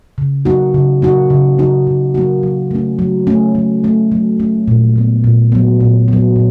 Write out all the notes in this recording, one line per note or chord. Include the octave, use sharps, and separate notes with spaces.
C#3
F#3 A#3 D#4 F#4
C#3
F#3 A#3 D#4 F#4
C#3
F#3 A#3 D#4 F#4
C#3
F#3 A#3 D#4 F#4
F#3
A3 C#4
F#3
A3 C#4
F#3
A3 C#4
F#3
A3 C#4
A#2
F#3 B3
A#2
F#3 B3
A#2
F#3 B3
A#2